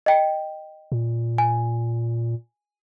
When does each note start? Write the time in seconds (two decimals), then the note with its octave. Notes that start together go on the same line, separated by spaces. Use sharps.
0.06 D#5 G5
0.92 A#2
1.38 G#5